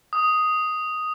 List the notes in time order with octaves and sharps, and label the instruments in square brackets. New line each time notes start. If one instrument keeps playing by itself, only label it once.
[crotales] D#6